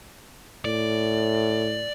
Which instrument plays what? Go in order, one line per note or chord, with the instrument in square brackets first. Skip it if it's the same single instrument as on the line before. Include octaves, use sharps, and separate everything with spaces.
[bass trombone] A2 [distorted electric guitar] D5